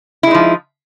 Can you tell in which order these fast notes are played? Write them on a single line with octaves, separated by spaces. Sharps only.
E4 G#3 D#4 F3